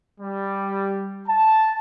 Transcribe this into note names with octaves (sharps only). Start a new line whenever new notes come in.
G3
A5